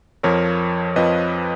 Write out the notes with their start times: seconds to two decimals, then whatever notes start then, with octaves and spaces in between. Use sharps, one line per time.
0.23 F2 F3 A#4 C#5
0.96 F2 F3 B4 D#5